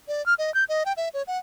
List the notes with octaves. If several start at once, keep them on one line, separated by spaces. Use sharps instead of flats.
D5
F6
D#5
G6
D#5
G5
E5
C#5
F#5